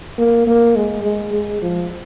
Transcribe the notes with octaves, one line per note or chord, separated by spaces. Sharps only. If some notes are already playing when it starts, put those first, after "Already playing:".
A#3
A#3
G#3
G#3
G#3
F3